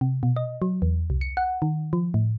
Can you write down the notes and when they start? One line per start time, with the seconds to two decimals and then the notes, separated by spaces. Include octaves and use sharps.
0.01 C3
0.23 B2
0.36 D#5
0.62 F#3
0.82 E2
1.10 C2
1.21 C#7
1.37 F#5
1.62 D#3
1.93 F3
2.14 A2